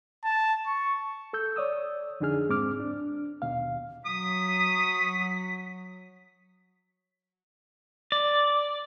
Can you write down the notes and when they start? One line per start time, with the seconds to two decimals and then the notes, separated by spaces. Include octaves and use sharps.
0.24 A5
0.67 C#6
1.33 A4 E6 G6
1.56 C#5 D5 D#6 E6
2.20 F2 D3 D4 D#4 G#4 F6
2.49 D2 G#2 C4 D6 F6
2.80 D4
3.42 D#2 B2 F5
4.05 F#3 D#6 B6
8.12 D5